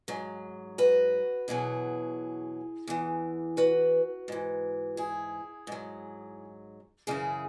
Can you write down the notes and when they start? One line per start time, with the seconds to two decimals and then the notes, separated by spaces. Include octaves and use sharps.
0.08 G#2 F#3
0.78 F#4 B4
1.48 E2 B2 F#3 E4 G#4
2.87 E2 E3
3.57 F#4 B4
4.28 G#2 E3
4.97 E4 G#4
5.67 G#2 F#3
7.07 F#2 C#3 E3 E4 G#4